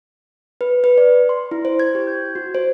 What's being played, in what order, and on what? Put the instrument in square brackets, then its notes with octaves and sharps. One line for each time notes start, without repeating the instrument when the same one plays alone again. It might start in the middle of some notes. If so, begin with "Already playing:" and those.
[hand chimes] B4
B4
D5
C6
E4
C5
G#6
G4
G6
F#4
C5